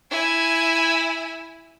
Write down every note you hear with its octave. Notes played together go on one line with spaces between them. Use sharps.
E4 G#5